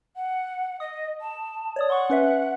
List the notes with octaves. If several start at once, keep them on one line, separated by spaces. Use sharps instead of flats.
F#5
D#5 D#6
A5
C#5 D5 D#6
F#5 C6 C#6
C#4 B4 E5